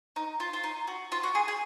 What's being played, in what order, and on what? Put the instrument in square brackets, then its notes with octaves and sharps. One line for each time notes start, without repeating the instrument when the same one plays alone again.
[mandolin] D#4
F4
F4
D#4
F#4
F4
F#4
G#4
G#4